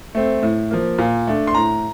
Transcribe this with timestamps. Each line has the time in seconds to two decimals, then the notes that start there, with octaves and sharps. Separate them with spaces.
0.15 A3 C4
0.43 A2
0.71 F3 A#3
0.98 A#2
1.27 A3 D4
1.47 C6
1.55 A2 A#5